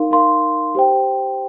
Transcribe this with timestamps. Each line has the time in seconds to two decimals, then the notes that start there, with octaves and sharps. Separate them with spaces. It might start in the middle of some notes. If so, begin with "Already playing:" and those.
Already playing: D#4 A#4 F5 C6
0.11 D#4 A#4 F5 C6
0.75 G4 C5 G5